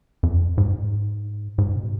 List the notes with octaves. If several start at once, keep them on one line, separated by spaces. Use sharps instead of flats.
F2
G#2
G#2
B2